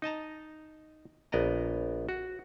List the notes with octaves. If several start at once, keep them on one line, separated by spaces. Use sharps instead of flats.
D#4 D#5 A5 A#5
A#1 B3 D5 D#5 A#5
F#4